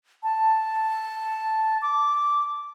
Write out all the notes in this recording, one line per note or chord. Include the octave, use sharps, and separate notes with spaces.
A5
D6